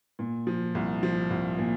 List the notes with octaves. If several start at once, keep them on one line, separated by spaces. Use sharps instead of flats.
A#2
F3
C2
F3
C2
A#2